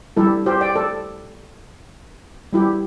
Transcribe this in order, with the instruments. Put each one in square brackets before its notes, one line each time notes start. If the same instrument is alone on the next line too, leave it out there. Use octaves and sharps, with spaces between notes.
[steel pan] G3 E4 G4 A4
G4 C5
D5 G5
A4 D5
G3 E4 G4